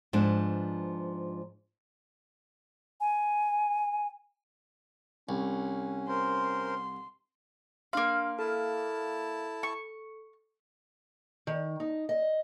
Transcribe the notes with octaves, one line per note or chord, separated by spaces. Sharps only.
G#2 F3 B3 D4
G#5
C2 C#4
A#4 C5 C6
A#3 D4 F5 C6
E4 A4 A5
C#6
D#3
D#4
D#5